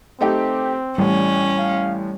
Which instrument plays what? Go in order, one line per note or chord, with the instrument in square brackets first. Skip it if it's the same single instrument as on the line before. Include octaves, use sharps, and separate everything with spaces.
[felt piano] A3 D#4 G4 [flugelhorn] C4
[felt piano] A1 A2 [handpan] G3 [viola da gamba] C#4
[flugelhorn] F5